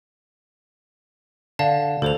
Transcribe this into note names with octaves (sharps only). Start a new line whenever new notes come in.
D3 D5 F5 A5
D2 A4 C5 F7